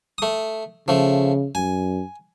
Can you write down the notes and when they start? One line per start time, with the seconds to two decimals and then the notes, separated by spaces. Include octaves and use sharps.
0.18 A3 D#6
0.88 C#3 F3 A3
1.55 F#2 G#5